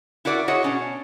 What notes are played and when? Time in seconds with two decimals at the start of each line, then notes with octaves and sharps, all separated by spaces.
0.25 E4 F#4 A#4 D5 F5 F#5
0.48 E4 F#4 G#4 C#5 D#5 F#5
0.63 B2 C#4 D4